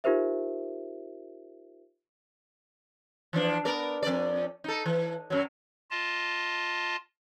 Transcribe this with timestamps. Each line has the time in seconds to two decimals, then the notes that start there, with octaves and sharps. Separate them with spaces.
0.04 D#4 F4 G4 A#4 C5 E5
3.33 E3 F3 D4
3.65 B3 A#4 D5
4.03 F2 D5
4.64 D#4 A4
4.86 E3
5.30 F#2 F#3
5.91 F4 D#5 A5